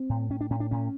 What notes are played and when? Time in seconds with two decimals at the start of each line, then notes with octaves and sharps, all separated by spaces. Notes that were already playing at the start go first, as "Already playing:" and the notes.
Already playing: C4
0.09 A2
0.30 A2 C#4
0.41 D4
0.50 A2 C#4
0.60 D4
0.71 A2 C#4